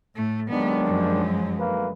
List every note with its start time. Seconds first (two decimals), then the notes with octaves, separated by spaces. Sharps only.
0.16 A2 A3
0.50 D#2 D#3 F#3 G#3 B3 D4
0.84 F#2 F3
1.59 D2 A#3 B4